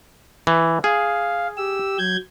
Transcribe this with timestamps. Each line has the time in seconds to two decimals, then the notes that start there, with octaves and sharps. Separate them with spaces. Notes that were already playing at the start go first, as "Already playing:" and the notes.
0.47 E3
0.84 G#4 F5
1.57 G4 E6
1.98 F#3 G6 G#6